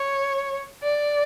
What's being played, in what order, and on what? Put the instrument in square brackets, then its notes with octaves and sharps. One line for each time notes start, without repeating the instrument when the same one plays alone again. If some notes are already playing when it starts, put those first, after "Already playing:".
Already playing: [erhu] C#5
D5